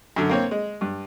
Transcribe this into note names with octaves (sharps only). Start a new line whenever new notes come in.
F#2 D3
A#3 C4 C#5
G#3
G2